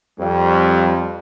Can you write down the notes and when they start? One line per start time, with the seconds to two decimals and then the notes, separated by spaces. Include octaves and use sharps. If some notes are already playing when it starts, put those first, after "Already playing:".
0.20 F2 G3